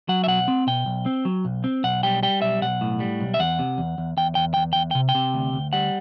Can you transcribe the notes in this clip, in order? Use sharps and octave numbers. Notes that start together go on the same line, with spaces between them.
F#3 F#5
E5
B1 F#5
C4
B2 G5
B1
C4
F#3
B1
C4
B1 F#5
G3 G5
G3 G5
B1 E5
B1 F#5
A2
G3
B1
E5
E2 F#5
C3
E2
E2
E2 G5
E2 G5
E2 G5
E2 G5
C3 G5
G5
C3
D2
D2
G3 F#5